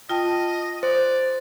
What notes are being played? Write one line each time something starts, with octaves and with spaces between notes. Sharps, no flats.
F4 D#5 G5 A5
C5 D5